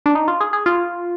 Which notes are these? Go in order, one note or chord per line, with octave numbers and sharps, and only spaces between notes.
D4
D#4
F4
G#4
G#4
F4